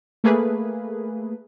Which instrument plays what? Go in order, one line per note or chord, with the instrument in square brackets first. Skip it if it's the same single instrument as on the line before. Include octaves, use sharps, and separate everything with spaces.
[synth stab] A3 A#3 G#4 B4